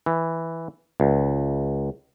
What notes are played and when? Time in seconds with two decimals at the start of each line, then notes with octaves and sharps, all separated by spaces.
0.06 E3
1.00 C#2